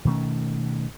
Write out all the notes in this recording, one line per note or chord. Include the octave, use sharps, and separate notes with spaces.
B2 D#3 A3 C#4